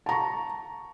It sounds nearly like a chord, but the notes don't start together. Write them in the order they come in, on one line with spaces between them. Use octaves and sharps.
A5 A#5 C#6